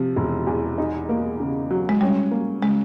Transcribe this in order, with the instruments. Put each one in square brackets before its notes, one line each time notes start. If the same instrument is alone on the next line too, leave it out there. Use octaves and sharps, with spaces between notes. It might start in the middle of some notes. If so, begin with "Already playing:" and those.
Already playing: [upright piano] C3 F3
E1
E2
D#4
A#3
C#3
F#3
[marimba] G#3
[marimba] G3 [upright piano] C#4
[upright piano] A#3
[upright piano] C#3 [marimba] G#3